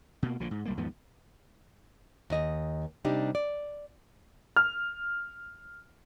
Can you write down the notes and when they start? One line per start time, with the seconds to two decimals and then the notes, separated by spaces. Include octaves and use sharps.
0.23 B2 A#3
0.40 A#1 A#2 D3 F3
0.51 G#2
0.65 B1 G3 A#3
0.77 D#2 G#2 F3 B3
2.30 D#2 D#5
3.05 C3 G3 D4 D#4 G4
3.35 D5
4.56 F6